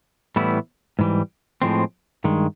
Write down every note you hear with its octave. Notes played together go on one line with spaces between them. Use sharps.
A2 E3 G3 B3 E4
G#2 E3 G3
A2 F3 G#3 C4
G2 D#3 G#3